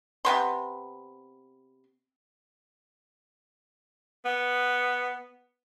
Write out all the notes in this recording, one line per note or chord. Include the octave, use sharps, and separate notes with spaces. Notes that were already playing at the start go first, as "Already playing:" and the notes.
C3 B3 C6
B3